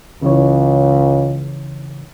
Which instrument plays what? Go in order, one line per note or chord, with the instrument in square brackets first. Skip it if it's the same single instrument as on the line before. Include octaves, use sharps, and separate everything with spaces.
[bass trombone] C#2 [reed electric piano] C#3 E3 C#5